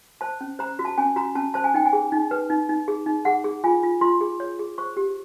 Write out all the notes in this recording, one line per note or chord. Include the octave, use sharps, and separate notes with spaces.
C5 A5
C#4
C5 A#5
F#4
A5
C#4 G#5
F#4 A#5
C#4 A5
C5 A5
G#5
D#4 G5
G#5
G#4
D#4
B4
D#4
D#4
G#4
D#4
G#4 F#5
G#4
F4 G#5
F4
F4 C6
G#4
C#5
G#4
C5 C#6
G4